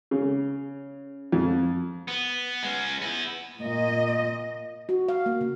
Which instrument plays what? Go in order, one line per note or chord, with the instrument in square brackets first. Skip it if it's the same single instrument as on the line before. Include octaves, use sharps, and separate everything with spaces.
[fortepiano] C#3
F2
[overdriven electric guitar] B3
G#3 C#4
B3 E4
[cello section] A#2 D#5
[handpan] F#4
F5
A#3
C#3